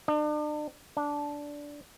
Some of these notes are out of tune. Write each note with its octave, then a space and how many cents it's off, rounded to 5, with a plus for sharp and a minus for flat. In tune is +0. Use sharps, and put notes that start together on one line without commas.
D4 +40
D4 -10